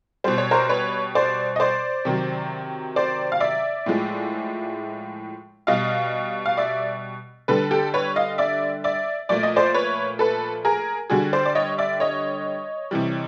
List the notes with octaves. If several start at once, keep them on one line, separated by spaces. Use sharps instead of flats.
B2 G3 C5
C#5
A#4 C5
B4 C#5
C5 D5
D#5
C5 D5
C3 D#3 F#3
C5 D5
F5
D5 E5
A2 F3 G#3
B2 G3 D#5 F5
F5
D5 E5
D3 G3 A4 B4
G4 A4
B4 C#5
D#5 F5
D5 E5
D5 E5
A#2 F3 A3 D5
D#5
C5 D5
B4 C#5
A4 B4
G#4 A#4
D3 G3 F#4 G#4
C5 D5
D5
C#5 D#5
D5 E5
C#5 D#5
C3 E3 G3